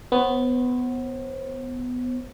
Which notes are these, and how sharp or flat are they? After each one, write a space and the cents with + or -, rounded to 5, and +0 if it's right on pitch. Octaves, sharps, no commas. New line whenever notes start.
B3 +10 C5 +40